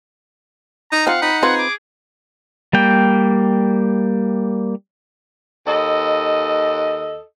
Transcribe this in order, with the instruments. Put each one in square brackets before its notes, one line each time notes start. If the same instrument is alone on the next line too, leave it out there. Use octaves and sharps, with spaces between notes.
[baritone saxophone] D#4 [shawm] A#5
[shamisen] C4 F4 [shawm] F5 [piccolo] F#5
[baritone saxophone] D#4 [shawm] B5
[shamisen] C4 F4 B4 [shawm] G#4
[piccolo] D6
[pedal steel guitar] G3 A#3 G5
[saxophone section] D#2 A4 D#5